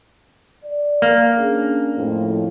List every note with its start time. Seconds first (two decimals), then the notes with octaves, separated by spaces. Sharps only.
0.65 D5
1.02 A#3
1.37 C#4 D4 G#4
1.96 F2 A2